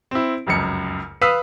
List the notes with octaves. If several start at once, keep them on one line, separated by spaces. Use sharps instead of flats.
C4 E4
F1 C#2 F#2 C#7
B4 F5 D#6 E6 B6